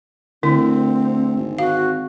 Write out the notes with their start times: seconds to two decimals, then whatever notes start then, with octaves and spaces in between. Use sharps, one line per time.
0.43 D2 D3 C4 E4
1.37 G#1
1.59 F#4 F5